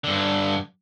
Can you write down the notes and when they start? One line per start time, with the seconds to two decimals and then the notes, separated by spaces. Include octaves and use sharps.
0.04 G2 D3